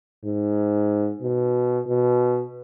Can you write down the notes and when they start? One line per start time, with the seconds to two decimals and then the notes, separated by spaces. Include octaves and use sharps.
0.25 G#2
1.23 B2
1.87 B2